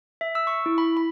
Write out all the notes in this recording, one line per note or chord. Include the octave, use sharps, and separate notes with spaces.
E5
E6
C#6
E4
B5
B5